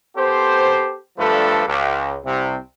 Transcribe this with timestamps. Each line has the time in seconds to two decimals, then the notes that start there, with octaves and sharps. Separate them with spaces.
0.17 B3 G4 A4 C5
1.18 G2 F3 A3 D4 A4 B4
1.67 C#2
2.25 C2 C3